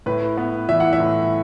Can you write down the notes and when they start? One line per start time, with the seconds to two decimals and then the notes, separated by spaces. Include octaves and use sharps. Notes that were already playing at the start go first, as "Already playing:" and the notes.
0.06 A2 B4
0.38 B3
0.69 E3 E5
0.80 F#5
0.93 E5
1.00 A2